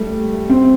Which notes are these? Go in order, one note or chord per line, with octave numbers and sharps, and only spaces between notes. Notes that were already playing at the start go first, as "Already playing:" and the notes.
Already playing: G3 A3
C4